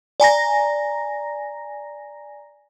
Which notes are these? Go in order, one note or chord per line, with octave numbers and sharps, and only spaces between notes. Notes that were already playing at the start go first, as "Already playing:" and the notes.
D5 G#5 A#5 A#6